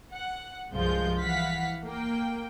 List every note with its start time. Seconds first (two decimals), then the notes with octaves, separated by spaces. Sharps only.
0.13 F#5
0.73 C2 G2 F3 G#3 F4 G6
1.19 E3 F5 F#5 B6
1.86 A#3 G5